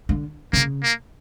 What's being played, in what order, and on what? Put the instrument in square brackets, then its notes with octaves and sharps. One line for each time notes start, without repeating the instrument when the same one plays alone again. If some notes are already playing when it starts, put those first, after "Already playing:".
[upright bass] D3
[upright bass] C#3 [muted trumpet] A#3
[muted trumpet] A#3